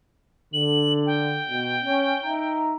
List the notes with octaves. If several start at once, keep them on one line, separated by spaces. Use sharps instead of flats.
D3 F#7
G5
B2
C#4
D#4 E5 A#5